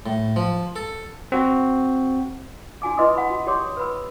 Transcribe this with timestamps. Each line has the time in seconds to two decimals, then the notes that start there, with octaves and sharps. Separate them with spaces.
0.06 A2
0.36 F3
0.76 A4
1.32 C4 F#4
2.82 D4 F#4 G#5 D6
2.97 E4 B4 D#5 C6 D6 D#6
3.15 F#5 B5
3.30 F#4
3.47 G4 C#5 G5 C6 D6 D#6
3.77 B4 B5 E6